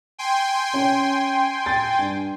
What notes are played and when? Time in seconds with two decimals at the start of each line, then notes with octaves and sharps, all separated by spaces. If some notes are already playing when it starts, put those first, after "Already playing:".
0.19 G5 G#5 C6
0.73 C#4 C#5
1.66 A6
1.98 G2